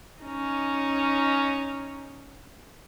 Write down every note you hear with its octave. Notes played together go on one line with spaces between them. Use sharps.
C#4 D#4